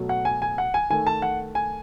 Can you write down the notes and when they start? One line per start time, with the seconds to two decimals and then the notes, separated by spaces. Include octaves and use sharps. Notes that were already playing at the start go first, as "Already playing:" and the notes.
Already playing: B2 F#3 A3
0.09 F#5
0.25 G#5
0.42 G#5
0.58 F#5
0.74 G#5
0.90 D#3 A3 G#5
1.07 A5
1.22 F#5
1.55 G#5